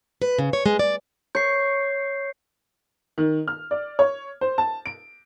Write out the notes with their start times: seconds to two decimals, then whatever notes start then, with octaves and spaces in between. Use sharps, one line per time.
0.22 B4
0.38 C#3
0.53 C#5
0.66 G#3
0.79 D5
1.35 C#5 G6 C7
3.18 D#3
3.48 F6
3.71 D5
3.99 C#5
4.41 C5
4.58 A5
4.86 D7